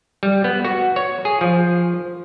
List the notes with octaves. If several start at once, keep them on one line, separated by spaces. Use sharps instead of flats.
G3
B3
F#4
C#5
G#4
F3